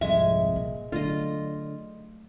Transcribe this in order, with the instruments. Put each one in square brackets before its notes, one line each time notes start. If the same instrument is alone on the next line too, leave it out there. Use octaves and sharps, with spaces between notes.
[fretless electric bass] C2 F2 [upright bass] G#2 [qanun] G#3 [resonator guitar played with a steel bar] E5
[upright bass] A#2
[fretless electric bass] D3 [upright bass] F#3 A3 [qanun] F4 D#5